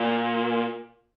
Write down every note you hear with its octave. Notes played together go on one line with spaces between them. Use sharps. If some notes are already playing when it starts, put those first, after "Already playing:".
Already playing: A#2